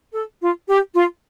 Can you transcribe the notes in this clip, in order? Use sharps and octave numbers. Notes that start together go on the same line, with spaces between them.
A4
F4
G4
F4